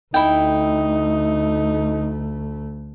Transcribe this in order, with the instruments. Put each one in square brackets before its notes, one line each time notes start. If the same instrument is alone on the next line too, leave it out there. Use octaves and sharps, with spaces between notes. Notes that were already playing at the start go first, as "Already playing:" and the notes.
[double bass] D2 A3 [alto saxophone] D#4 [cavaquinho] E4 G5